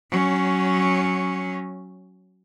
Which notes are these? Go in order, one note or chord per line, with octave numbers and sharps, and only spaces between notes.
F#3 C#4